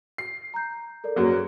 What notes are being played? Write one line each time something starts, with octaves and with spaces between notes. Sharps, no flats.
C7
A#5 G6
A4 A#4 D5
F#2 F#3 A#3 G#4 B4